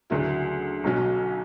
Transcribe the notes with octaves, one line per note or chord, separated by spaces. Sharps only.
D2 C#3 F#3 A#3 E4
B1 B2 F#3 C#4 F#4